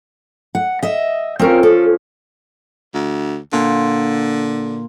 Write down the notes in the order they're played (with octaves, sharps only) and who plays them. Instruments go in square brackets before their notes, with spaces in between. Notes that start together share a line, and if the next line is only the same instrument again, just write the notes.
[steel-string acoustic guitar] F#5
D#5 E5
[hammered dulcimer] F3 C#4 [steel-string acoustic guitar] C4 A#4
[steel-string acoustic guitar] A4
[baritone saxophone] D2
[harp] A#2 [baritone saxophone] D3